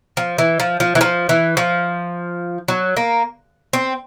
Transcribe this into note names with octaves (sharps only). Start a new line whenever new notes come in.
F3
E3
F3
F3
E3
F3
E3
F3
F#3
A#3
C4